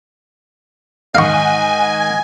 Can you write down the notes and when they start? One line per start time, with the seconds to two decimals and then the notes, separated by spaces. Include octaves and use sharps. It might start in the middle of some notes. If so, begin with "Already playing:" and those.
1.15 G#2 D#3 D#5 F5 F#5 G#5 C#6